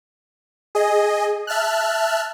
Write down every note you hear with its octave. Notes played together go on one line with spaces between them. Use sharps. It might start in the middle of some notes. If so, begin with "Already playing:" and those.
G#4 D#5
E5 A5 F6 F#6